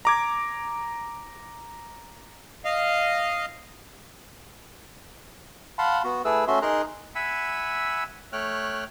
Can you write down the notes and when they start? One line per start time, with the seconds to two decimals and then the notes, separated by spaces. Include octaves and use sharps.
0.05 A#5 D6 G#6
2.64 D#5 F5
5.78 F5 F#5 A5 B5 C6
6.04 B3 F#4
6.25 A3 E4 G#4 B4 E6
6.48 A3 C#4 F#4 E5 C6
6.62 D#4 G#4 A#4 A#5 C6 F#6
7.15 E5 F#5 G#5 B5 E6
8.33 A3 C#5 G5 F6 F#6